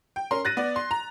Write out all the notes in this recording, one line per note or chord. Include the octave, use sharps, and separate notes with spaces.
G5
C#4 A#4 C6
F#6 A6 A#6 D#7
B3 D5
C6
A#5